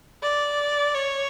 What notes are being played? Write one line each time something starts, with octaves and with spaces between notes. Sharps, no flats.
D5
C#5